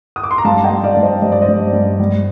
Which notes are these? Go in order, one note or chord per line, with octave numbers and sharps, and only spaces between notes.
D#6
D6
C6
A#5
G2 F5 A5
D#5 G5
G2
D5 F5
G2 D5
C5 D#5
G2 D#5
D5
C5 D#5
G2
G2
G3